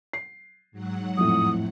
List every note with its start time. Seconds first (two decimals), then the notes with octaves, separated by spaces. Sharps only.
0.13 C7
0.71 G#2 F#3 F#5
1.17 F2 A2 D#6